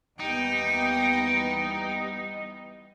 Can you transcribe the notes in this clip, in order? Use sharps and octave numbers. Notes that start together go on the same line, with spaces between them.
D#2 E3 G3 B3 D#4 G5